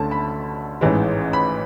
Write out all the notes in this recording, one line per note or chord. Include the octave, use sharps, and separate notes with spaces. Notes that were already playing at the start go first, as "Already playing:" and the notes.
Already playing: D2 D3 A3 C#4 A5
B5
A1 G#2 E3 G#3
B5